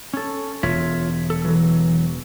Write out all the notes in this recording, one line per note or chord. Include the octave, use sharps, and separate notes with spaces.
C#4 A4
E1 F4 C#5 E5
A4
E3 F#3